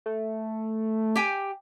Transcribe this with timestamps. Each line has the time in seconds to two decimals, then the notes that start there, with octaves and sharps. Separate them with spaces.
0.06 A3
1.16 G4 G5 G#5